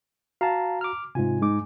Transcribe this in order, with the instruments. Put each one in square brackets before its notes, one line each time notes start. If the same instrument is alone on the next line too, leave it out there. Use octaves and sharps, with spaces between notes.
[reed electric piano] F#4 A#5 [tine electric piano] F5 A5
[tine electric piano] D6 F6
[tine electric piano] G#2 G#5 [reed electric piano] C3 F4
[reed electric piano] G#3 D#4 D6